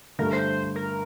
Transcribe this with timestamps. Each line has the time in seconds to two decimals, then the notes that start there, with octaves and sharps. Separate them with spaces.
0.19 G2 D3 A3 A#4
0.33 C5
0.76 A#4